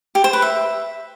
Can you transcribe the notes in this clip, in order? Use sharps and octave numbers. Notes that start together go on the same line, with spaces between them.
G4
C5
B4
E5